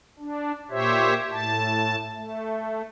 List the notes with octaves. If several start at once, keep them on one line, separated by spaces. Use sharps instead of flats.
D4
A#2 G4 C5 C#5 E5
A2 A5
A3